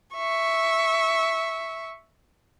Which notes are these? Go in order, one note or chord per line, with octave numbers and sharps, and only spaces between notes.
E5 C#6